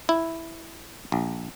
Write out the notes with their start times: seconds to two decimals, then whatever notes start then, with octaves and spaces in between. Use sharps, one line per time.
0.09 E4
1.12 A#1